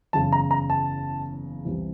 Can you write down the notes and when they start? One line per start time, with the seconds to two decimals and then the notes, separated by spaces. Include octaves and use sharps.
0.13 F#1 E2 C#3 A5
0.32 A#5
0.51 A#5
0.70 A5
1.65 C2 C3 E3